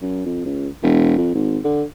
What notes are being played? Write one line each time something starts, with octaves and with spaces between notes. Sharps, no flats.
F#2
F2
C#2
E1
F2
G#1
D3